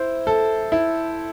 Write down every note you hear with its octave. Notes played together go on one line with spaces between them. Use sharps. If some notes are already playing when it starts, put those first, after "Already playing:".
Already playing: E4 C5
A4
E4